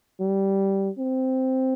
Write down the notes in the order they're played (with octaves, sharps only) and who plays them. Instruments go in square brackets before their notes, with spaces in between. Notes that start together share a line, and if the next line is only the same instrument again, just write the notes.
[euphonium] G3
C4